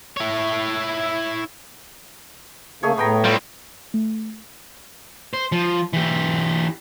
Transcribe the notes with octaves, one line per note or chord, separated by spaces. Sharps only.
E4 C#5
C#3 A3 A#3 G#4 C#5
A2 B3 G5 A#5
G3 E4 F4 C5
A3
C5
F3
E3 G4